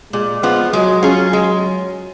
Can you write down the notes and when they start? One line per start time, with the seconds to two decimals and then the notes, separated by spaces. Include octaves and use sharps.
0.13 A#2 G#3
0.43 F3 B3 F4
0.73 F#3 G#3
1.03 C#4 F4 G#4
1.33 G#3